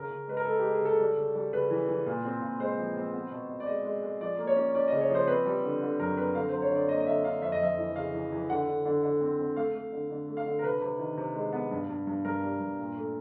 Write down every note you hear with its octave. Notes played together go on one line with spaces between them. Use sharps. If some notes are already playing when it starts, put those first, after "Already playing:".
Already playing: C#3 A#4
C#3
G#3 B4
A#4
G#3 A4
G4
G#3
G#4
C#3 A4
G3
C#3
G3
C#3 B4
E3
E3
A#2
C4
A#2
G#3 C5
F3
C4
B3
B2
B2
D5
G#3 D#5
G#3
G#3
F3 D5
A#3
C#5
C#4
C#4 D5
D#5
C#3
C#5
F3
C5
C4 B4
G3
D3
D3
F#2 A#4
C4 B4
D3 F5
F#3 C5
C#5
D3 D5
A#3 D#5
D#5
D3 E5
D3 F5
F2 E5
D#5
F2 E5
E3
C#3 F5
E3
E3
D3 F#5
D3
D3
D3
C4
C4
A3 F5
A3
D3
D3
A3
F5
D3
A#4
C3 B4
C3
D#3
C3
G#3
B3
G2
G2
G2
G2 A#4
G3
G2
A#2
A3